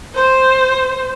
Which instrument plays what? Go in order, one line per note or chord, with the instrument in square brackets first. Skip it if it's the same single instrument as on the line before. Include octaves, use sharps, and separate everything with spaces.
[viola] C5